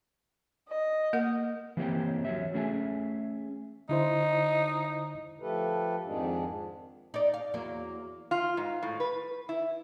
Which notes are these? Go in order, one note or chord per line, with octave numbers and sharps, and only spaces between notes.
D#5
A#3 A#4 F#5
E3 A#3 C4 G4 C#5 G5
F#3 C#5 E5
A3 C#4 G#4 E5 G5 G#5
D3 D#4 E4 C5
F3 A3 G4 A4 B4
F2 G#2 D#3 G#3 D4
D#4 D5
F5
E2 F#3 A#3
F4
G#2
A2
B4
E4